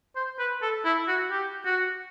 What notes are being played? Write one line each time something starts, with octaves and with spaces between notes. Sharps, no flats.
C5
B4
A4
E4
F#4
G4
F#4